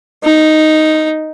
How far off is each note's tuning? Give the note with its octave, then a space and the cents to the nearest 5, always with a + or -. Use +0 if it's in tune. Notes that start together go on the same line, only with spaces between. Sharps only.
D#4 +0